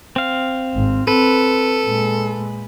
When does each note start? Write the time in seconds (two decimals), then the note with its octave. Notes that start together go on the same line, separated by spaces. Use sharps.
0.16 C4 F5
0.75 G#1
1.08 C4 A4 B4
1.85 A#2 G#3